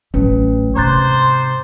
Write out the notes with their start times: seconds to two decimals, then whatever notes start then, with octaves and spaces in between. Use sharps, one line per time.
0.14 A1 F#3 A3 C#4 B4
0.76 G#2 C3 C5 A#5 D6 F#6 A6